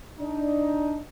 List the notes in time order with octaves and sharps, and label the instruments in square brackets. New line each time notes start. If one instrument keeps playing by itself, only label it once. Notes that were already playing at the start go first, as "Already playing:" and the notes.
[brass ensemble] D4 D#4